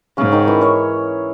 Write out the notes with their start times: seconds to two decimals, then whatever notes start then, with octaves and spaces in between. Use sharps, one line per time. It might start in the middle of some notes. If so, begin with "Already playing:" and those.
0.17 G#2 C#3 C#4
0.32 D#3 D#4
0.48 E3 E4
0.61 C#4 C#5